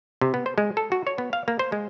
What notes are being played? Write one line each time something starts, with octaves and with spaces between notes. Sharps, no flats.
C3
B3
C5
G#3
A4
F#4
C#5
B3
F5
A#3
C5
G#3